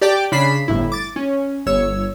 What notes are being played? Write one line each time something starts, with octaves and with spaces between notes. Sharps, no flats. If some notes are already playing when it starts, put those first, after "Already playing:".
G4 D5 G5 A5 D6
C#3 D4 B5 B6 C7 E7
G1 A2 E4
D6 A6
C#4
G1 C#5 E6